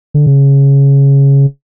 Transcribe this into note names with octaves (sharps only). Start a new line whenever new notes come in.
D3
C#3